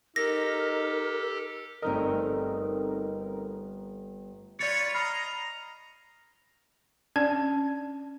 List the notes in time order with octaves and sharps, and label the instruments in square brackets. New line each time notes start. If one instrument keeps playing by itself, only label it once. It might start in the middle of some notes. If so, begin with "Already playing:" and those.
[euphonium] D#4 [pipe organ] G4 A4 [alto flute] A#4 [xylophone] A#6
[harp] G1 A3 D#5 [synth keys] C4 D#4 A#4
[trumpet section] F4 B4 C#5 [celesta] D5 A6 C#7
[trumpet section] D#5 A#5 [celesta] B5 F6 C7
[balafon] C#4 D4 D5 A5